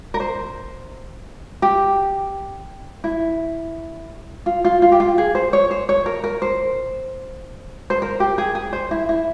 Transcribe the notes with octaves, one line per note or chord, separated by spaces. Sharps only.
A#4
C5
G4
E4
F4
F4
F4
G4
F4
G#4
C5
C#5
C5
C#5
A#4
A#4
C5
C5
A#4
G4
G#4
G#4
C5
E4
E4